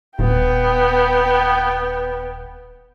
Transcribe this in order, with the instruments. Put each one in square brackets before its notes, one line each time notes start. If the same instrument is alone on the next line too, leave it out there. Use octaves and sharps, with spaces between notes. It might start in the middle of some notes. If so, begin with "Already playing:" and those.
[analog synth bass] D#1 [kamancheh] B3 G5